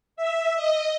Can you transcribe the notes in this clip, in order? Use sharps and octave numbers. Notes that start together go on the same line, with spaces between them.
E5
D#5